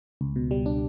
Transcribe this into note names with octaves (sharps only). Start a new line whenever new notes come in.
C#2
B2
G3
D4